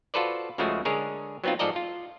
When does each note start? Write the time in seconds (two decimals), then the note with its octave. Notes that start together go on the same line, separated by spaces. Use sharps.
0.14 F4 F#4 A4 B4 C5 D5
0.58 C#2 C#3 F3 G#3 A3 F#4
0.85 D3 G#3 G#4 A#4 C#5
1.44 F#3 B3 C4 D#4 F4
1.59 G#2 F3 A4 D5 D#5 A#5
1.76 F4